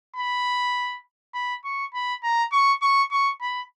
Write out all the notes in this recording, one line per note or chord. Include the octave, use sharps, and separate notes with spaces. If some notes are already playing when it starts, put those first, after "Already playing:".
B5
B5
C#6
B5
A#5
C#6
C#6
C#6
B5